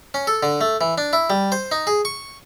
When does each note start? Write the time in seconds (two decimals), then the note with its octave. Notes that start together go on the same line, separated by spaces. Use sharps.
0.14 C#4
0.27 A4
0.43 D3
0.61 A3
0.81 E3
0.98 D4
1.13 E4
1.30 G3
1.52 C5
1.71 D#4
1.87 G#4
2.05 C#6